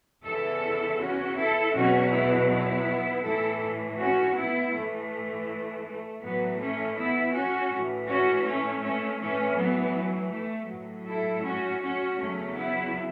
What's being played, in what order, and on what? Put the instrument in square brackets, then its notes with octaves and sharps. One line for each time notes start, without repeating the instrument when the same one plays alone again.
[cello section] E2 C#3 E3 E4 A4
C#4 F#4
E4 A4
E2 B2 F#3 C#4 F#4
B3 E4
B3 E4
A2 E3 E4 A4
C#4 F#4
B3 E4
A2 E3 A3
A3
A2 E3 F#3 B3
A3 C#4
B3 E4
C#4 F#4
A2
E3
C#4 F#4
A3 C#4
A3 C#4
A2 E3 A3 C#4
F#3 B3
F#3
A3
A2 F#3
E4 A4
C#4 F#4
C#4 F#4
E2 C#3 F#3 A3 C#4
B3 E4